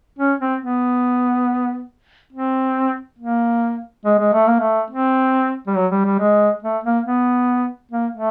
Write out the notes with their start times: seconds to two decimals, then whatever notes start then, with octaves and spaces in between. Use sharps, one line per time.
0.19 C#4
0.40 C4
0.61 B3
2.33 C4
3.19 A#3
4.05 G#3
4.19 G#3
4.33 A3
4.47 A#3
4.61 A3
4.90 C4
5.67 G3
5.76 F#3
5.91 G3
6.05 G3
6.19 G#3
6.63 A3
6.84 A#3
7.05 B3
7.92 A#3
8.13 A3